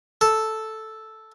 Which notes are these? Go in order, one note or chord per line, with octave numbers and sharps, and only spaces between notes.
A4